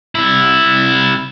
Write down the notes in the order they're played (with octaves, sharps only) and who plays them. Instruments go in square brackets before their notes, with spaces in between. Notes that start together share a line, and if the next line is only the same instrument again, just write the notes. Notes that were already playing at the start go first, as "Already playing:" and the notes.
[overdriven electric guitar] C2 E4